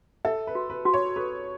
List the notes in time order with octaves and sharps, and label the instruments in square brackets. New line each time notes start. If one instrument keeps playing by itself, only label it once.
[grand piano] A4 [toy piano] E5
[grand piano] B4
[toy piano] F#4
[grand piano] B4
[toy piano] F#4
[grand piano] C#5
[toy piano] A4 [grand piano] B4